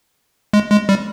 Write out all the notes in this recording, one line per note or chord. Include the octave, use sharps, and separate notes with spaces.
G#3
G#3
G3